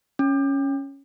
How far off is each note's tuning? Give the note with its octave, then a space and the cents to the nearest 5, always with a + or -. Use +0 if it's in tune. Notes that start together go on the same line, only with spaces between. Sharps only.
C#4 -5